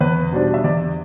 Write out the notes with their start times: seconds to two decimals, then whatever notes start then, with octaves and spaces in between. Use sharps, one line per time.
0.01 E2 B4
0.32 B2 G3 D4 C5
0.54 E5
0.64 E2 D5